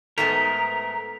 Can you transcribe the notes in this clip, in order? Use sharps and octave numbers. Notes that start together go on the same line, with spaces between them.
G#2 A3 B3 A#4 B6